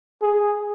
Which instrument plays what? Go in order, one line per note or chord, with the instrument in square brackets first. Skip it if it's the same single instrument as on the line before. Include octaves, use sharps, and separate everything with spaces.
[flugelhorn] G#4